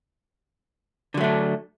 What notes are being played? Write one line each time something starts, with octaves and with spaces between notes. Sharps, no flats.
D3 F#3 A3 D4